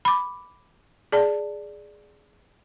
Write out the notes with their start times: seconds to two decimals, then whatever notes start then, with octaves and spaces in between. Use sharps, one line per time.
0.05 B5 D6
1.12 G#4 D5 A5